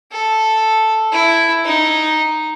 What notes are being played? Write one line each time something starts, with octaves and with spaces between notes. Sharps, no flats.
A4
E4
D#4